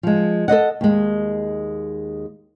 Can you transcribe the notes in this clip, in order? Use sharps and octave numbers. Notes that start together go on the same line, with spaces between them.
F3 G#3
A4 C5 D#5 F#5
D#2 G#3